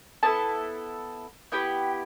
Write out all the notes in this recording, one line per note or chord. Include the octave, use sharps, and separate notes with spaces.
B3 E4 A4 A5
B3 E4 G4 G5